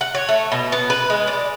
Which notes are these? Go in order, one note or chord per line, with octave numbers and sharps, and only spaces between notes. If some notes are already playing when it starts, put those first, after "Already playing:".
F#5
C#5
A3
B2
B3
B4
G#3
D5